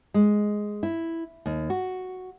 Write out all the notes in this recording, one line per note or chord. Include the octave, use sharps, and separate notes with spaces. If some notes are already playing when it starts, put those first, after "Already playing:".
G#3
E4
D#2
F#4